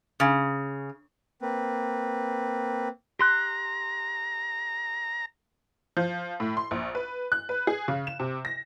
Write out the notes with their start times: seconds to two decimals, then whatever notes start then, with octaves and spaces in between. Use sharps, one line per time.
0.20 C#3
1.42 A#3 C4 B4
3.19 G4 A#5 C6 F#6
5.97 F3
6.40 A2
6.57 C6
6.71 A#1
6.95 B4
7.32 F#6
7.49 B4
7.67 G#4
7.88 C#3
8.07 E7
8.19 C3
8.45 A#6